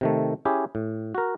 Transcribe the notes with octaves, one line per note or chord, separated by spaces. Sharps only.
C3 D#3 A3
C#4 E4 G4 G#4
A2
F#4 A#4